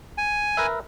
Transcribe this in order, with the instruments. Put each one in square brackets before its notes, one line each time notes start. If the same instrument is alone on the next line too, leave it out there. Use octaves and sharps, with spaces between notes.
[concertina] G#5
[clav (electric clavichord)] A#4 B4 E5